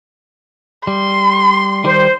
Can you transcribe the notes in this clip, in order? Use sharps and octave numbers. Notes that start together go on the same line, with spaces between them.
G3 C6
D#3 G3 C5